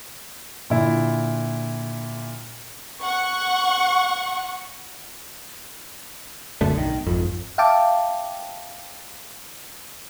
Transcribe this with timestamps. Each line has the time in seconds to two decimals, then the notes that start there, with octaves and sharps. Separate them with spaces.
0.70 A#2 D3 E4
3.01 F#5 C#6
6.61 D1 F#2 D3 A3
6.75 B1 D#3
7.07 G#1 F2
7.58 E5 F5 G5 A5 D6